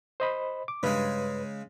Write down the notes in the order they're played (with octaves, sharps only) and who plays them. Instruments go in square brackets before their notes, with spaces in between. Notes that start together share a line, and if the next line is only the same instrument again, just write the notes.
[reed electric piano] C5 D#5 B5
D6
[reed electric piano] G2 B4 [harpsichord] C#3 G#3